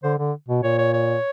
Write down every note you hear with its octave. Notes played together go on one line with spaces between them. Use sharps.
D3 C5
D3
B2
A#2 C#5
C#5
C#5